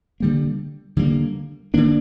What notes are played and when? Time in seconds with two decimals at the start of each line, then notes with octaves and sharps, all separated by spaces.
0.20 D3 G3 A#3
0.97 D3 G3 A#3
1.74 D3 F3 A#3 D4